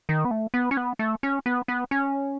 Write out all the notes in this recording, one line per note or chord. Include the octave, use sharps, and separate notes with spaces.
D#3
B3
A3
B3
C#4
B3
A3
C#4
B3
B3
C#4